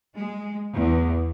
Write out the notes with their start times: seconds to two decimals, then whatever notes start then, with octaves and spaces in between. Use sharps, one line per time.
0.14 G#3
0.74 E2